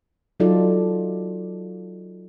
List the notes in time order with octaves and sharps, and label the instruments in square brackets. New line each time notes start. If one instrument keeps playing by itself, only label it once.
[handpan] F#3 D#4 F4 A4 D5